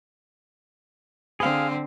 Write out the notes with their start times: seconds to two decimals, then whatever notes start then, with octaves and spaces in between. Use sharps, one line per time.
1.40 D3 C4 G#4 F5